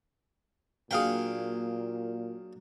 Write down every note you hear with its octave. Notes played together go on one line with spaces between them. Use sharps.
A#2 F#3 A#3 D4 G#4 F5 G5